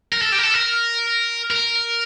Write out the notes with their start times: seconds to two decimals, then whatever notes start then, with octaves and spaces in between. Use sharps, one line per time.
0.12 A#4
0.22 A4
0.32 G4
0.39 A#4
0.43 A4
0.54 A#4
1.51 A#4